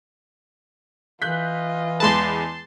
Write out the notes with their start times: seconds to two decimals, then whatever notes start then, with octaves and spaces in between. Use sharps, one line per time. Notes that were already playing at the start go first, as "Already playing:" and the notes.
1.22 E3 F4 D#5 F#6 G6 B6
2.00 E2 G#3 B4 A5 C6